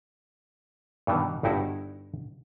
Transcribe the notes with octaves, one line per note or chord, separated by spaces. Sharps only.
G2 B2 D#3 E3
G1 G2 D#4 E4 F#4